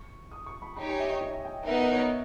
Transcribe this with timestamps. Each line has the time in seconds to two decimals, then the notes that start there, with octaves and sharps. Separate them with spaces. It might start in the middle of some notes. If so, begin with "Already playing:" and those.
Already playing: C#6
0.31 D#6
0.46 C#6
0.62 B5
0.77 D#4 G4 C#5 B5
0.89 G#5
1.00 E5
1.11 D#5
1.21 C#5
1.45 G5
1.66 B3 D#4 A#4 E5
1.77 E5
1.82 D#5
1.92 C#5
1.97 D#5